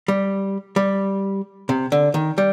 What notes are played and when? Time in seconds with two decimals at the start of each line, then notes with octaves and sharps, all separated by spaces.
0.08 G3
0.76 G3
1.69 C3
1.92 D3
2.14 D#3
2.38 G3